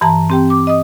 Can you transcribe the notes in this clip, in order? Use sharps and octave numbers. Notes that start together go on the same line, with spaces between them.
G2 E3 A5 A#5
C4 G4 G5
D6
D#5 D#6